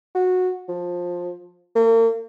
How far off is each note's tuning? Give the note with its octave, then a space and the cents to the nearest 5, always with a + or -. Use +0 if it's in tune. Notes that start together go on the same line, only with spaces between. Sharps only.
F#4 -15
F3 +15
A#3 -40